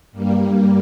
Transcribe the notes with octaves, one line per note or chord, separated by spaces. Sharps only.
G2 G3 A#3